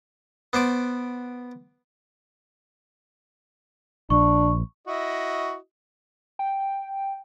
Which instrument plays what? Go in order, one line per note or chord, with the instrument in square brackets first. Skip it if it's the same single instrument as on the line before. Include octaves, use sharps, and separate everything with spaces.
[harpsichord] B3 C5 D5 D6
[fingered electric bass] A#1 [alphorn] D4 [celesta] C#6
[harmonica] E4 F#4 D#5
[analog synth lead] G5